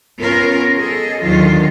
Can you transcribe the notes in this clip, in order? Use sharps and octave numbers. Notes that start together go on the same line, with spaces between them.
B3 C#4 F4 A#4
G#4 A4 D#5
D#2 D3 D#3 F#3 F4